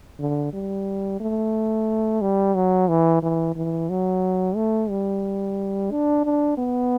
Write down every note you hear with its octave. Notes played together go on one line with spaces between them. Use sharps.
D3
G3
A3
G3
F#3
E3
E3
E3
F#3
A3
G3
D4
D4
B3